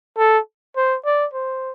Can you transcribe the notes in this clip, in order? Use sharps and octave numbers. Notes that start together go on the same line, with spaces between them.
A4
C5
D5
C5